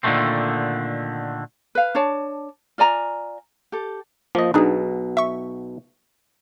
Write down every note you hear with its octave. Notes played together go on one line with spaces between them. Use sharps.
A#2 D3 D#3 F3 A3 C4
B4 F5
D4 C#5 A5
F4 D5 G#5 A#5
G4 A4
F3 A#3 D#5
B1 B2 D4 D#4 G#4
E5 C#6